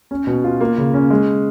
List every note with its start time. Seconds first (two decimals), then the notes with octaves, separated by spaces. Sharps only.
0.11 C#4
0.27 B2
0.44 F4
0.61 A#3
0.78 C#3
0.94 C#4
1.10 G#3